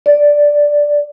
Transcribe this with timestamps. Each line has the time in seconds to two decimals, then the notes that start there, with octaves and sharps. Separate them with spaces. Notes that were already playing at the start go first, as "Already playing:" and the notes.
0.06 D5